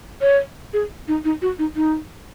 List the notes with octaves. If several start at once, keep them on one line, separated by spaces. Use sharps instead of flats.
C#5
G#4
D#4
D#4
F#4
D#4
D#4